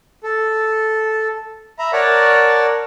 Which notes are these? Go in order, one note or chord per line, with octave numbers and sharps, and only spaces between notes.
A4
E5 A#5 B5
A#4 C#5 D5 F#5 A5